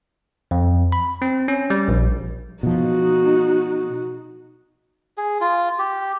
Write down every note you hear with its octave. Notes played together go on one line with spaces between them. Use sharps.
F2
B5
C4
C#4
G3
A#1
B2 F3 D#4 F#4
G#4
F4
G4